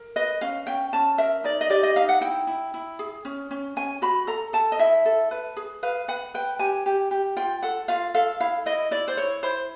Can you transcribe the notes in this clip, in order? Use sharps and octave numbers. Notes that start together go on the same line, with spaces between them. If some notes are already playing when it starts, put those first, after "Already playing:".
Already playing: A#4
B4 D#5
C#4 F5
C#4 G5
C#4 A5
A#4 E5
D#4 D5
D#5
G4 D5
D#5
D#4 F5
F#5
E4 G5
E4
E4
G#4
C#4
C#4
C#4 G#5
F#4 B5
A4 A#5
A4 A5
D#5
E4 E5
A4
B4
G#4
B4 F5
B4 F#5
B4 G5
G4 G#5
G4
G4
F4 G5
A4 F#5
F4 F5
A4 F5
E4 F5
E4 D#5
E4 D5
C5
E4 C#5
E4 C5